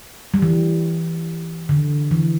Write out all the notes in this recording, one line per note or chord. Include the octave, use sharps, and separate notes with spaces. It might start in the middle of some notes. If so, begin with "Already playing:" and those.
G3
E3
D3
E3